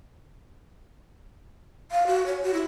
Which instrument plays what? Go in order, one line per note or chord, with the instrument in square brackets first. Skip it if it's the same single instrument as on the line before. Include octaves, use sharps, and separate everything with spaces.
[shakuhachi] F5
F#4
C#5
F#4
E4